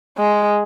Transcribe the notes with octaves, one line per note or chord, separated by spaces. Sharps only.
G#3